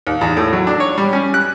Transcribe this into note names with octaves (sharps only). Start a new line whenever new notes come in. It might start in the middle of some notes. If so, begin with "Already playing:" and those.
D#2
E2
A2
F#3
D4
C#5
G3
C#4
F#6